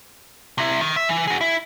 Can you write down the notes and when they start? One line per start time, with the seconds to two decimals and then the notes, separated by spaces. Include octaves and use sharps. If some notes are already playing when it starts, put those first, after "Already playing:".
0.58 C3 E4
0.81 D#3
0.96 E5
1.09 E3
1.28 F#4 G#4
1.41 E4